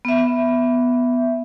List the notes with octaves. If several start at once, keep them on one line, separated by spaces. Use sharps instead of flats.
B3 E5